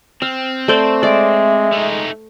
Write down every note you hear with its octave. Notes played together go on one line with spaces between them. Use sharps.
C4 F5
A3 C5 D5
G#3 D5 E5
A3 D#4